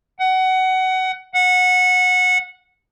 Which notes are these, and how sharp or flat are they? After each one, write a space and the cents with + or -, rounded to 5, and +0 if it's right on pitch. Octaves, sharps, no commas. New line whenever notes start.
F#5 +20
F#5 -20